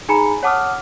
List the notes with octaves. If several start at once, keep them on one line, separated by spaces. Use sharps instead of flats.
D#4 G#4 G#5 A#5 B5 C#7
C#5 F#5 A5 D6 D#6 F6